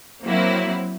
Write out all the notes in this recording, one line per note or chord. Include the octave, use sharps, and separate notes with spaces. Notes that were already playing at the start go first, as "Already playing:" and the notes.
F#3 A#3 C4 E4